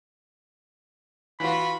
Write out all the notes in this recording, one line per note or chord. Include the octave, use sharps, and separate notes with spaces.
E3 F4 F#4 B5